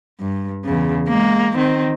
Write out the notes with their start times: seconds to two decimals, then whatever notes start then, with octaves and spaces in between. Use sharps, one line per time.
0.20 G2
0.65 E2 C#3
1.08 G#3 A#3
1.56 D#3 C4